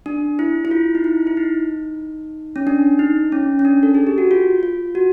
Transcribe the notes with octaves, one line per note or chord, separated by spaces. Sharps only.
D4
E4
E4
F4
D#4
E4
E4
D#4
C#4
D4
D#4
C#4
C#4
D4
A4
G#4
G4
F#4
F4
F4
F#4